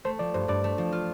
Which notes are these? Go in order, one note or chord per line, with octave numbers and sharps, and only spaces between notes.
A3 C5
F3 D5
G2 C5
G2 D5
A3
F3
F4